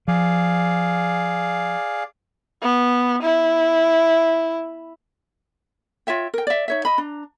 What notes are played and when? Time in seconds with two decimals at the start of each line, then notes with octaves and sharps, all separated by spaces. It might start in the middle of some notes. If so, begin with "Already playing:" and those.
0.08 F3 G#4 D5 F5
2.62 B3
3.23 E4
6.07 F4 C#5 E5 G5
6.34 A#4 G5
6.47 D5 E5
6.68 D#4 C#5 E5
6.85 D#5 B5
6.98 D4 A#5